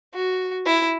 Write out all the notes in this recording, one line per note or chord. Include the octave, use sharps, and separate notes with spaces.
F#4
E4